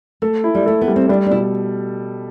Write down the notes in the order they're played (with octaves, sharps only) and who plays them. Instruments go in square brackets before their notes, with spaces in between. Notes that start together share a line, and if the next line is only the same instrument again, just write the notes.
[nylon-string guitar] A3 [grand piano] A4
[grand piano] E4
[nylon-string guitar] G3
[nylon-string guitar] A3 [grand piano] A4
[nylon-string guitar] B3
[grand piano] G3
[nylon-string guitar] C4
[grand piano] G3 [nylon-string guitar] D4
[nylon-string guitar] D4
[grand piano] B2 [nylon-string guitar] E4